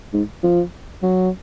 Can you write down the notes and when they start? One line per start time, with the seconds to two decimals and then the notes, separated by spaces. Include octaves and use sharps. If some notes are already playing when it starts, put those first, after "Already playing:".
0.13 G#2
0.43 F3
1.02 F#3